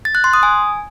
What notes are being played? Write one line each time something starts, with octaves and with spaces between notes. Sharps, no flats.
A6
F#6
C6
D#6
G#5